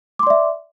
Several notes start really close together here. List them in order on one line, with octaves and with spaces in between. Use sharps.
D6 C6 D5 E5